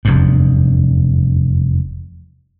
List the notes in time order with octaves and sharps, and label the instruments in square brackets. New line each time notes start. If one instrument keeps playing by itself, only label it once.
[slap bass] F1 E2 G2